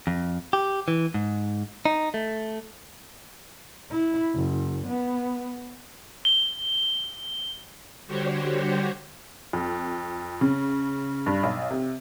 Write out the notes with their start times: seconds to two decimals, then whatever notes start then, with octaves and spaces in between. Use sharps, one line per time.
0.07 F2
0.53 G4
0.88 E3
1.14 G#2
1.85 D#4
2.14 A3
3.90 E4
4.34 F#1
4.87 B3
6.25 G7
8.07 D3 G3 F#4 G4 C5 C#5
9.53 F2
10.41 C#3
11.26 G2
11.43 B1
11.70 C3